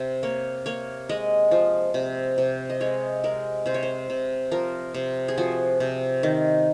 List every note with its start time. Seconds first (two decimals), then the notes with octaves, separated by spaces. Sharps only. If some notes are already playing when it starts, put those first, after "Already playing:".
Already playing: C3
0.23 A#3 C#5
0.66 A#3 C#5
1.09 G#3 D#5
1.51 F3
1.94 C3
2.38 C3
2.70 D#5
2.80 G#3 C#5
3.24 G#3 A#4
3.66 C3 C5
3.74 C#5
3.83 C5
4.10 C3
4.51 F3 A#4
4.94 C3
5.28 G#4
5.38 F3 F#4
5.80 C3
6.23 D#3